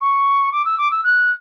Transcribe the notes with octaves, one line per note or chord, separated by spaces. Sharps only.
C#6
D6
E6
D6
E6
F#6